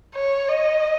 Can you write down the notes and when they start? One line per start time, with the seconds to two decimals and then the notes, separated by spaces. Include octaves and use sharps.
0.14 C#5
0.48 D#5